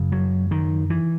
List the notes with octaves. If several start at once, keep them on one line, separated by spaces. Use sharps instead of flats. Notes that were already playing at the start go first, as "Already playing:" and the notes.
Already playing: F#2 C#3
F#3
D#3
E3